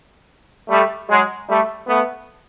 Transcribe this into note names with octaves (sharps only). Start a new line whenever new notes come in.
G3 A3
F#3 G#3
G3 A3
A3 B3